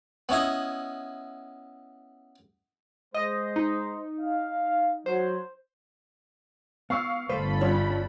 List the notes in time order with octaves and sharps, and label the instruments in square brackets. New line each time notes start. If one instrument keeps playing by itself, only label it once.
[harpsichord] B3 C#4 E4 D#5
[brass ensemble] G#3 C5 [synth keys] D#5
[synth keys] D#4
[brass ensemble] F5
[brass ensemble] F#3 [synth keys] C5
[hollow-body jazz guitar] B3 [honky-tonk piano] F5 C#6 E6
[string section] G1 A4 B5 [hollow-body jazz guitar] A3 B4 C5
[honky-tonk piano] G2 C#4 [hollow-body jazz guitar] F4 C#5 E5